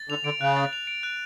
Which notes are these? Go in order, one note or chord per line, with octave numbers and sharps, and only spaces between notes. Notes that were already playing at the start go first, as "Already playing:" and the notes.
Already playing: A6
D3 F7
D3 D7
C#3 F#6
A6
F7
D7
F#6